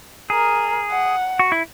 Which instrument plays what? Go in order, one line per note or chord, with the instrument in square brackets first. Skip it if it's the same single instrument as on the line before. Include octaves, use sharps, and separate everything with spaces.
[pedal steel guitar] G#4 [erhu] A#4
[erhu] F#5
[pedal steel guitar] F#4
E4